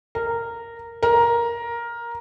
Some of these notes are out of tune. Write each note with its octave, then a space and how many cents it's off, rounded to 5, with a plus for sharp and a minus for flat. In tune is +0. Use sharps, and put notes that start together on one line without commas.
A#4 -10
A#4 +10